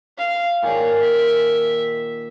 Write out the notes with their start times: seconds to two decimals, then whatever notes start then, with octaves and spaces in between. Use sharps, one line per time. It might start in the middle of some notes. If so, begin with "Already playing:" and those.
0.18 F5
0.63 A#2 D#3 G#4 C#5
1.01 E5